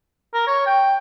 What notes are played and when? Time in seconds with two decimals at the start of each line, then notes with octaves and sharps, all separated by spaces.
0.34 A#4
0.47 C#5
0.66 G5